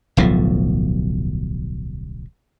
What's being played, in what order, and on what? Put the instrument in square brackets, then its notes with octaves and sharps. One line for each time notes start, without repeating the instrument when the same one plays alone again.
[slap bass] D1 B1 A2 F3